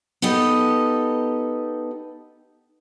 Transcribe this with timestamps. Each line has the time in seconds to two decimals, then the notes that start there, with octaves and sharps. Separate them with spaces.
0.22 B3 D#4 G4 A4 D#5